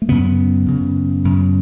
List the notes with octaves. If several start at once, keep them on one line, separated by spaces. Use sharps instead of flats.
A3
F#2 C#3 B3
F#2 C#3
F#2 C#3